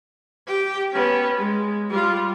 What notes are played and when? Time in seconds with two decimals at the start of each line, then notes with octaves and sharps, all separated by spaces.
0.47 G4 G5
0.92 B3 C#4
1.36 G#3
1.90 G3 F4